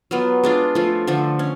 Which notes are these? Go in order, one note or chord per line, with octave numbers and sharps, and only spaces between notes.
F#3 B3 F4
G#3 D4 F4
F3 A3 F4
D3 F3 A3
C#4